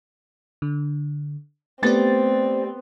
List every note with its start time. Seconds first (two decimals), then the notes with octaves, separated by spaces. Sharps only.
0.62 D3
1.83 A3 B3 C4 G4 D5 A6